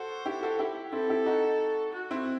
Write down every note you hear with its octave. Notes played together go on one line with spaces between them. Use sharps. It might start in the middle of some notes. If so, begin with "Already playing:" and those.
Already playing: F#4 A4 C5
E4 G4
F#4 A4
E4 G4
C4 E4 A4
E4 G4
D#4 F#4
F#4
C4 E4